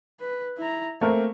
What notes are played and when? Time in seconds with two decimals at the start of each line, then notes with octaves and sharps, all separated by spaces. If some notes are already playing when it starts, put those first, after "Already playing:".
0.20 B4
0.58 E4 A#5
1.01 A3 A#3 C4 A#4